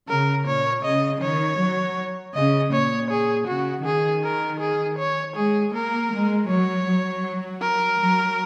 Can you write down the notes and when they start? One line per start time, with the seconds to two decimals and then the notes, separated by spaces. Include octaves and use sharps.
0.09 C#3 A#4
0.47 A#2 C#5
0.84 C#3 D#5
1.22 D#3 C#5
1.60 F#3
2.34 C#3 D#5
2.73 A#2 C#5
3.10 G#4
3.48 C#3 F#4
3.85 D#3 G#4
4.24 A#4
4.60 G#4
4.98 C#5
5.36 G#3 G#4
5.74 A#3 A#4
6.11 G#3
6.49 F#3 C#5
6.86 F#3
7.61 A#4
7.99 F#3